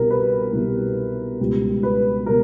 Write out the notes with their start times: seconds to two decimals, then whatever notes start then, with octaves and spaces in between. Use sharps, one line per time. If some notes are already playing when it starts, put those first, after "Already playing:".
Already playing: C2 B2 G3 A#4
0.10 B4
0.53 C2 B2 G3
1.40 C#2 B2 G3
1.83 B4
2.26 B2 G3 A#4